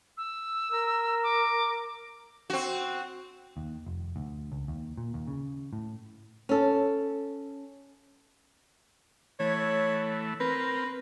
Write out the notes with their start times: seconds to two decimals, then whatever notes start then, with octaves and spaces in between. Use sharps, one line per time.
0.17 E6
0.72 A#4
1.23 D6
2.50 C4 F#4
3.57 D#2
3.86 F1
4.16 D2
4.52 C#2
4.68 D#2
4.97 A#2
5.14 D#2
5.27 C#3
5.73 A2
6.49 C#4 A4
9.40 E3 A3 C#5
10.40 C4 A#4 B4